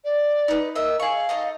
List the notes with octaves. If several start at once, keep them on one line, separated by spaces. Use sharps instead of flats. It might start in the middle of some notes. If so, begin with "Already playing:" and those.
D5
D#4 B4
A#4 D#5 E5
G#4 F5 C#6
D#4 A4 D#5